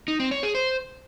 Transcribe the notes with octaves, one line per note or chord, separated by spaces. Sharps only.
D#4
C4
C#5
G#4
C5